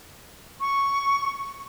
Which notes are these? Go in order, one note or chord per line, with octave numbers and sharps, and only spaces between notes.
C#6